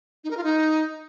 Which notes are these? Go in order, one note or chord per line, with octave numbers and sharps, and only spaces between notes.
D#4
A#4
F4
D#4